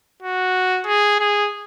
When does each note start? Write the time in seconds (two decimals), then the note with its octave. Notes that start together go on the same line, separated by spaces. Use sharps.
0.22 F#4
0.86 G#4
1.20 G#4